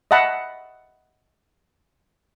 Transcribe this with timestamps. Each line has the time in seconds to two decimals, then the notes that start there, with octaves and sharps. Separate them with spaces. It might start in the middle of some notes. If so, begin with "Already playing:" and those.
0.11 D#5 E5 F#5 A5 B5